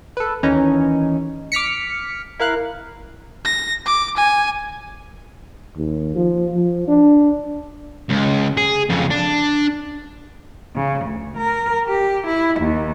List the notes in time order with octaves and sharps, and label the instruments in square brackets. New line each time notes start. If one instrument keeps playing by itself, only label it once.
[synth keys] A4 B4
D#2 E3 C#4 D#4
D6 F6 B6 C#7
E4 A#4 F5 F#6
[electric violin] A#6
D6
G#5
[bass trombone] D#2
F3
F3
D4
[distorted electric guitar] C#2
G#4
F2 C#3
D4
[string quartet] C#3
D2
A#4
G4
E4
D#2